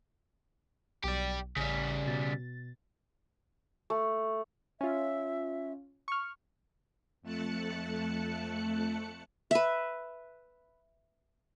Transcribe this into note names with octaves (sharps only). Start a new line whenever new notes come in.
B1 G4 D5
A1 C#3 G3
B2 A6
A3
C#4 F4 E5
C#6 F6
F2 A3 A5 F#6 C#7
B4 E5